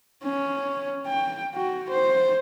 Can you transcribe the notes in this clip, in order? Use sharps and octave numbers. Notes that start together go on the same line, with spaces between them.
C#4
G5
F#4
C5